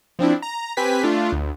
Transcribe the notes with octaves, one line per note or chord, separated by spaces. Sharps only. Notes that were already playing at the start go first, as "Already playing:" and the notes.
F3 C4 D4 E4
A#5
C4 G4 B4 G#5 B6
A3 D4 F4
D2